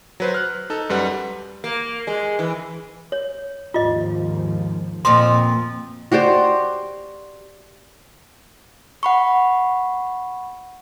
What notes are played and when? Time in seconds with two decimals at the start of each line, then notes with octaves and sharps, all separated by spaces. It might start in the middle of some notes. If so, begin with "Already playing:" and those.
0.20 F#3 B4 C5
0.34 F6 F#6
0.70 D#4 A4
0.90 F#2 G3 B4 F#5
1.64 A#3
2.07 G#3
2.39 E3
3.12 C#5
3.74 D#2 G#2 F3 F4 D#5
5.05 F2 A#2 F3 C6
6.12 F#4 G4 C5 D5
9.03 F#5 B5 C#6